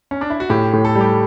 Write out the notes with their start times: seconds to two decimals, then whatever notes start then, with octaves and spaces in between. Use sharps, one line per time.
0.11 C#4
0.21 D4
0.30 E4
0.40 F#4
0.50 A2 G4
0.73 A2
0.85 A4
0.95 G3
1.01 G4